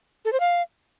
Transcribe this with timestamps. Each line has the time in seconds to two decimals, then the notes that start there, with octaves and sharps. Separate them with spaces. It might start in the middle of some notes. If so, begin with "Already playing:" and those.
0.25 A4
0.32 C5
0.40 F5